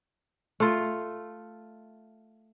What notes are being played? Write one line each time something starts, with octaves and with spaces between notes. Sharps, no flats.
A3 F4